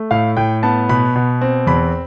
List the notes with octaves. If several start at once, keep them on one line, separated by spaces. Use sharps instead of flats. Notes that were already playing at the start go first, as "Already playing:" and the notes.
Already playing: A3
A2 F5
A2 G5
B3 A5
B2 B5
B2
C4
E2 B5